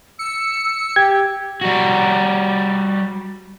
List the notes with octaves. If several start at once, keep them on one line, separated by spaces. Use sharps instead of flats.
E6 C#7
G4 G#6
G3 F#4